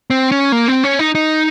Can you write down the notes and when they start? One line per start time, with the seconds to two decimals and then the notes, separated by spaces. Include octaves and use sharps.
0.10 C4
0.32 C#4
0.52 A#3
0.68 C4
0.84 C#4
0.99 D#4
1.15 D#4